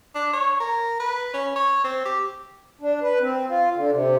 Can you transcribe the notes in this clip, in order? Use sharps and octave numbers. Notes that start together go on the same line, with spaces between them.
D4
C#5
A#4
B4
C#4
C#5
C4
G4
D4
B4
C4
F4
D3
C3